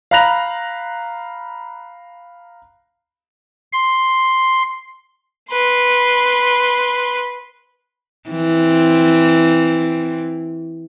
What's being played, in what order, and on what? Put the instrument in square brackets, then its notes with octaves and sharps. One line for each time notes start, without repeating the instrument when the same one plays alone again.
[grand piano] F5 A#5 B5 F#6 A#6 F7
[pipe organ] C6
[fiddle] B4 C6
[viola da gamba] E3 C4